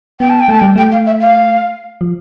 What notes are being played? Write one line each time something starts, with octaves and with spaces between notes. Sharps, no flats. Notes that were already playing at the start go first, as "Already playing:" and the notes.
B3 G5
A5
G5
A3 A5
G3 G5
A3 G5
F5
E5
F5
F3